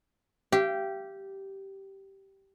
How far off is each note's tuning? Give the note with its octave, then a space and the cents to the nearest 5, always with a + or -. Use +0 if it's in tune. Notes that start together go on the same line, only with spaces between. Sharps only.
G4 -10 F5 -45